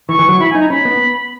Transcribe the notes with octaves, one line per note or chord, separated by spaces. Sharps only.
E3 C#6
E3
F#3
E4 B5
G#5
D#4
A#5
C#4 B5
B3